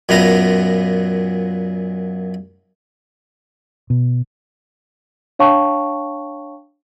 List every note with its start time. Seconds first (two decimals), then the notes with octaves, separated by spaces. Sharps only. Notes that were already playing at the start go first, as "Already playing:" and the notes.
0.09 F#2 A#2 B3 A#5
3.90 B2
5.39 D4 C#5 F5 G5 A5 C#6